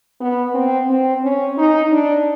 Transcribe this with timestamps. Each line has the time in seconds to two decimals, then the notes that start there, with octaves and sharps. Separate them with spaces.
0.21 B3
0.54 C4
0.90 C4
1.24 C#4
1.58 D#4
1.92 D4